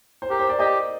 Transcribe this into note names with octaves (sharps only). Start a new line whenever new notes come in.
C5
G4 A#4
C5
D5
G4 D#5